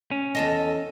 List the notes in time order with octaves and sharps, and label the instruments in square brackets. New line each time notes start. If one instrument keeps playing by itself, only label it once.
[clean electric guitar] C#4
[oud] E2 A4 D#5